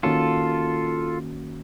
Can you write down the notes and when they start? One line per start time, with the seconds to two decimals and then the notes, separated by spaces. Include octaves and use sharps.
0.03 D#3 A#3 C#4 F4 F#4 A4